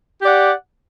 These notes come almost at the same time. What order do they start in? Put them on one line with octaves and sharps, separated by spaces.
G4 D5 F#5